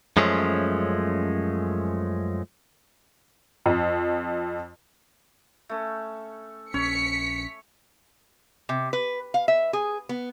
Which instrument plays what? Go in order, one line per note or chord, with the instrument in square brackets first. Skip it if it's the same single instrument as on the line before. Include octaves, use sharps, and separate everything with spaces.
[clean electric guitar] F#2 F3 G#3 A3 C#4
[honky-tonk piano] F2
[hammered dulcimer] A3 C#4
[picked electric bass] A#1 C#4 [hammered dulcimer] C#5 [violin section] B6 C#7
[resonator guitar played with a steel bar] C3
B4
F5
E5
G#4
B3